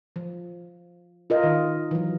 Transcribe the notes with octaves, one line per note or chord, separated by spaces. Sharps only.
F3
F4 A#4 D#5
D#3
E3 F#3